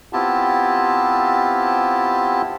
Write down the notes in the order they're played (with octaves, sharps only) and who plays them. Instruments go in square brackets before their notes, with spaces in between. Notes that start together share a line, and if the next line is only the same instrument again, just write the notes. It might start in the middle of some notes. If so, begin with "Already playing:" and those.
[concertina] B3 C4 E4 F4 G4 A5